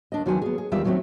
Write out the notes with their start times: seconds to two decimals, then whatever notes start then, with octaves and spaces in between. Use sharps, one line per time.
0.12 D#2 D4 D#5
0.26 E2 D#3 F#3 F#4 C5 G#5
0.42 B3 G#4
0.58 G#4
0.72 E2 D#3 G3 F4 G4 E5
0.84 D#3 F#3 A3 A#3 C4 C#4